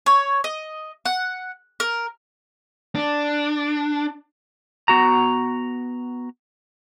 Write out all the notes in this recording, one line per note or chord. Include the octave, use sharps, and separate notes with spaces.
C#5
D#5
F#5
A#4
D4
B3 F#4 A#5